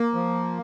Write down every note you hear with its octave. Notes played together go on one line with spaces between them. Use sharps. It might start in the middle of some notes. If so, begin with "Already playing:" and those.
Already playing: A#3
F3